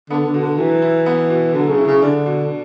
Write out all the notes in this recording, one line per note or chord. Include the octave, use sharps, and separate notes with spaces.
D3 B3
D3
B2
D3
E3 F#3
E4
B3
B2
D3 F#3
C#3
E4
C#3
D3 D4
B2